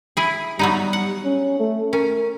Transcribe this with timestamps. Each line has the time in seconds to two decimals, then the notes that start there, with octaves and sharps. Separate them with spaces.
0.17 E4 G#4
0.59 F#3 G3 B3 D#4
0.93 F#5
1.25 C#4
1.59 A3
1.93 C#4 A#4